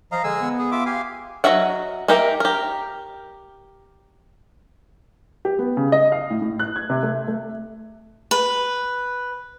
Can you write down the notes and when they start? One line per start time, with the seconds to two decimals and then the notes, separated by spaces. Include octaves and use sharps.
0.12 F3 D#5 F5 A#5
0.24 D3 G#3 G#5 E6
0.41 B3
0.59 G#4
0.72 F4 E5 D6
0.86 G4 F5 G#5
1.44 F#3 F#4 D#5 E5 F#5
2.08 A#3 D#4 G4 A#4 E5
2.40 G4 A#4
5.45 G4
5.59 B3
5.77 C#3
5.92 D#5
6.12 F5
6.30 A2
6.42 A2
6.59 F#6
6.76 G#6
6.90 C3
7.03 A3
7.28 A3
8.31 B4